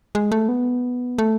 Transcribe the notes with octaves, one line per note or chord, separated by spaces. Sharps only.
G#3
A3
B3
A3